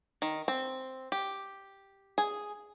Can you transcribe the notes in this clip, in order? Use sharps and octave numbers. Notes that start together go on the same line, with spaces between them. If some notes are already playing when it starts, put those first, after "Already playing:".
D#3
C4
G4
G#4